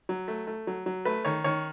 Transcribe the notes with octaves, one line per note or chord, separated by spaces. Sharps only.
F#3
A3
A3
F#3
F#3
A3 B4
D#3 C#5
D#3 C#5